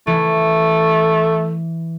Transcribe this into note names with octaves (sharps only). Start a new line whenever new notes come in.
E3 A3